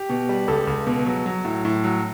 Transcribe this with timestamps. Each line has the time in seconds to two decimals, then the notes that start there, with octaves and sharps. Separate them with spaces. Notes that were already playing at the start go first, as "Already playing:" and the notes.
Already playing: G4
0.09 B2
0.29 G3
0.48 C#2 A4
0.67 C#2
0.87 B2
1.06 F#3
1.26 F#3
1.45 A2
1.65 A2
1.84 F#3